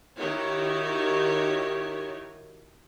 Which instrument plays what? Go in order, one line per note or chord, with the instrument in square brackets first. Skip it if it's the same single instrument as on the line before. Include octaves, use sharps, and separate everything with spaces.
[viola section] D#3 D#4 E4 F#4 G4 C#5